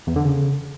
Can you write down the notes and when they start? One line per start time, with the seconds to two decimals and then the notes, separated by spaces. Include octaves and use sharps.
0.07 E2
0.16 D3
0.25 C#3